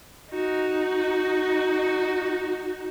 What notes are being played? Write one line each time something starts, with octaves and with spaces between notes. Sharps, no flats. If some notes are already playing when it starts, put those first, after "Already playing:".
D#4 F#4